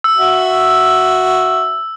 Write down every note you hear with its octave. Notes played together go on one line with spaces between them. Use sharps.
E6
F#4 E5